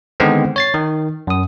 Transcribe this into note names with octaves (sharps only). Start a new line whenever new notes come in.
D3 D#3 G#3 B3 C4
C#5 A6 C7
D#3
F#2 D#6